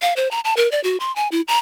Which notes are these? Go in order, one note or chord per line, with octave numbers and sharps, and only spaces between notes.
F5
C5
A#5
A5
A#4
D5
F#4
C6
G#5
E4
A#5